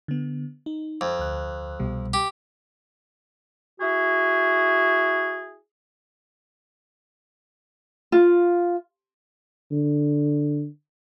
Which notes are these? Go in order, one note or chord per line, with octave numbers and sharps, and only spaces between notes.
D3 B3
D#4
F2
D2 F#6
C2 B2 G3
G4
E4 F#4 G#4
F4
D3